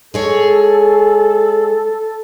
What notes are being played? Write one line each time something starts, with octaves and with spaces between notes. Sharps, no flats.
G#3 G#4 A4 C#5